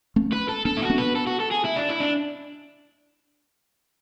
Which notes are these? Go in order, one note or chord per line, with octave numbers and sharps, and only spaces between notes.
A3 C#4
B4
A4
B3 D4 A4
E4
F#4
B3 D4
B4
A4
F#4
A4
G#4
E4
D4
E4
D4